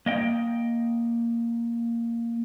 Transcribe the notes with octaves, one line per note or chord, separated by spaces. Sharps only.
A#3 D#5 G5